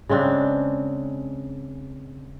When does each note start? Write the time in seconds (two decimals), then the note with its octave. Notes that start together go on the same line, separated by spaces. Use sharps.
0.09 C#3 G#3 C4 D4